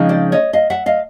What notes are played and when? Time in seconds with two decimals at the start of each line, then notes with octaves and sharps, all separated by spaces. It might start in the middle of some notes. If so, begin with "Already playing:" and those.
Already playing: C#3 F3 G#3 C4 D#4
0.09 C5 D5
0.32 C#5 D#5
0.53 D#5 F5
0.70 E5 F#5
0.86 D#5 F5